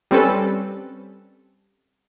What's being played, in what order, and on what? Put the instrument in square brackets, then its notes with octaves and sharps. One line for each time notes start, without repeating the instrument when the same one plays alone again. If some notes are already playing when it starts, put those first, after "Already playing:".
[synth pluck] G3 C4 C#4 A4 B4